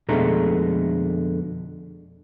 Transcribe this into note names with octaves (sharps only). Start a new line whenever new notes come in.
F2 B2 D3 G#3 A3 A#5